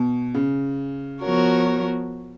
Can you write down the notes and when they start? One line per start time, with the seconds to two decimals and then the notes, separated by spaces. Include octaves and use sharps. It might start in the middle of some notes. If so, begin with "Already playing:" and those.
Already playing: B2
0.34 C#3
1.22 F3 B3 F#4 A#4 C#5